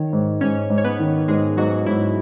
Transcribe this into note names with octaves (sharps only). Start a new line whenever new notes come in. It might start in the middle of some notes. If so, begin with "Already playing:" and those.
Already playing: D#3 C#5
G#2
G#2 C#4 C#5
G#2
C#5
B3 B4
D#3
G#2 G#3 G#4
G#2 F#3 F#4
G#2 E4